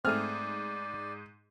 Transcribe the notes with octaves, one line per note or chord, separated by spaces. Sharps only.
G#2 A3 C4 G#4 D5 F6